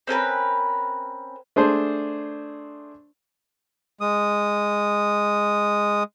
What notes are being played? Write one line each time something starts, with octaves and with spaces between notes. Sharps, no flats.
C4 C#4 A#4 B4
A3 D4 G#4 C5
G#3 D#6